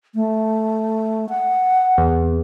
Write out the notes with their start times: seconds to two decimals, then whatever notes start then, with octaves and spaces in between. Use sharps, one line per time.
0.15 A3
1.29 F#5
1.98 E2